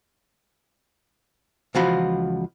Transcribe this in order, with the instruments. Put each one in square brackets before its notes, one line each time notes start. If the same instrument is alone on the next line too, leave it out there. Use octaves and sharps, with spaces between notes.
[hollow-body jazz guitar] C#2 E3 F3 F4 F#4 B5